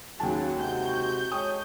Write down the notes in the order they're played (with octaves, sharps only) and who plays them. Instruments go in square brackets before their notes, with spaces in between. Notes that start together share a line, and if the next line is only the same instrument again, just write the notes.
[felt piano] D#2 G#5 A5 [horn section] C#3 [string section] F#3
[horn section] C3 G#3 F#4 [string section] G6
[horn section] G#3 A4 C#5 [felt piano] G5 D#6